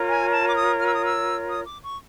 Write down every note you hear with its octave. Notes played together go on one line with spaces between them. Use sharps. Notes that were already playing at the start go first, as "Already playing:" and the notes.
Already playing: F4 A#4 C#5
G#5
A5
D6
D#6
F6
E6
D#6
E6
D#6
D6
C#6